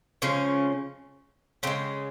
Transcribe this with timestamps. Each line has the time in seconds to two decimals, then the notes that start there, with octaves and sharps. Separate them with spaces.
0.22 C#3 F3 G#3 C#4
1.63 C#3 G#3 C4